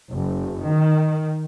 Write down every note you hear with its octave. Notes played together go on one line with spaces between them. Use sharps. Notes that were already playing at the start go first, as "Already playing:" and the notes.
F#1
D#3